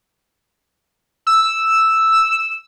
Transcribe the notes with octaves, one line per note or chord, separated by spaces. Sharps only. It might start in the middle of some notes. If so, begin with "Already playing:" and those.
E6